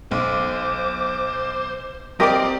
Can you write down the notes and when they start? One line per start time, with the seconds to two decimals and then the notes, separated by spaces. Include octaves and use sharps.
0.11 B1 C5 D6
2.20 C4 G4 A#4 D5 D#5 D6 D#6